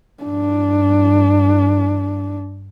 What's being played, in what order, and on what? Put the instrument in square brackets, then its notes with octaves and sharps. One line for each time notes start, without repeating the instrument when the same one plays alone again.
[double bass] G2 [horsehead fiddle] D4